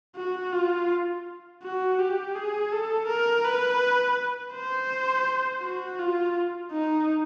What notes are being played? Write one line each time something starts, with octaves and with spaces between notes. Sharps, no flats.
F#4
F4
F#4
G4
G#4
A4
A#4
B4
C5
F#4
F4
D#4